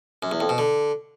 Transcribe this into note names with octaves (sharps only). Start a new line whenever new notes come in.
F#2
E2
F2
B2
D3